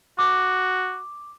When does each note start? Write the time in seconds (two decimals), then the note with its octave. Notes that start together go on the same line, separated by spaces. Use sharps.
0.19 F#4 D6